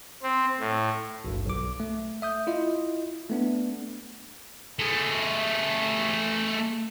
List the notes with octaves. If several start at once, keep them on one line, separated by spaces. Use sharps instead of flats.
C4
A2
G#1 C#2 G2
B1 D6
A3
E5 D#6 G6
E4 F4 D#5
A3 B3 D4
A3 G#4